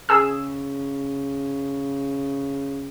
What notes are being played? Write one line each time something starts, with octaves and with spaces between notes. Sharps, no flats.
C#3 G#4 E6